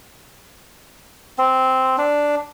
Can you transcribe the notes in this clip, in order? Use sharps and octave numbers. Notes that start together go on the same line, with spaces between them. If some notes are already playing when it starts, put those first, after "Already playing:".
C4
D4